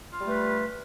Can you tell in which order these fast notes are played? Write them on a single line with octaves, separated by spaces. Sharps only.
F4 G3 A3 B4